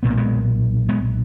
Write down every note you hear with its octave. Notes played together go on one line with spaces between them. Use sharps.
B1 A#2 B3
A#3
G#3 B3
G#3 B3